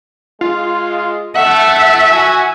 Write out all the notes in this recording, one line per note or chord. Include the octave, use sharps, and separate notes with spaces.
G#3 F4
A3 E5 F#5
F#4 G#5